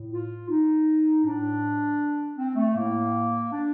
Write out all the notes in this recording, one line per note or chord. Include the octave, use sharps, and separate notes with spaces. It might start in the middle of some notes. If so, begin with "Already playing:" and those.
Already playing: A2
F4
D#4
A2 D4
C4
A3
A2 A#3
D4